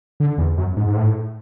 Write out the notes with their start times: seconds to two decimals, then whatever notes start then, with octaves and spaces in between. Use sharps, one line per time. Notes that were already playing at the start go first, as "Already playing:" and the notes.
0.20 D3
0.38 E2
0.58 F#2
0.77 G#2
0.87 G#2
0.96 A2